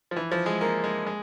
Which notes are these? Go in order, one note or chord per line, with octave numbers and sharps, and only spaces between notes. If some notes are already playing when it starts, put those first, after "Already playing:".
F3
E3
F3
G#3
A#3
G#3
G#3